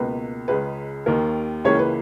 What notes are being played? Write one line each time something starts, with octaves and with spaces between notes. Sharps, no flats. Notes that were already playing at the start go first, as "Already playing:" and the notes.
Already playing: C#2 B2 A#3 B4
C#2 C#3 G#3 B4
D#2 D#3 A#3 A#4
C#2 C#3 E3 A#3 C#4 C#5
B4